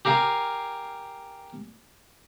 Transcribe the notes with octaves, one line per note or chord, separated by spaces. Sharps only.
G4 A#4 F5 G#5